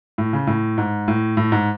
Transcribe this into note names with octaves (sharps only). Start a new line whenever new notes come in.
A2
C#3
A2
G#2
A2
A2
G#2